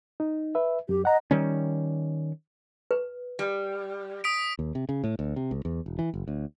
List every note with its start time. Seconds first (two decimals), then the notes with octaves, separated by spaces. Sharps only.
0.20 D#4
0.55 B4 E5
0.89 F#2 G4
1.05 D#5 F#5 A#5
1.31 D#3 G3 C#4
2.91 B4
3.39 G3
4.24 D#6 B6 D7
4.59 D#2
4.75 C3
4.89 C#3
5.04 A2
5.19 D2
5.36 C3
5.51 C#2
5.65 E2
5.86 E1
5.99 E3
6.14 F#1
6.28 D2